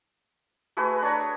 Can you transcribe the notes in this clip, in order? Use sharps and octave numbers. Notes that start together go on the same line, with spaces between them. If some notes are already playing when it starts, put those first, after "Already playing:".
A3 F#4 G#4 B4
D4 C#5 A#5